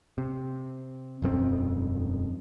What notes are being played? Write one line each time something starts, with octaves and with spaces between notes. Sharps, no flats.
C3
E1 F#2 A3 C4